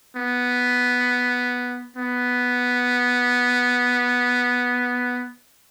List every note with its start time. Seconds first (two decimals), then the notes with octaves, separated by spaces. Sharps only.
0.16 B3
1.96 B3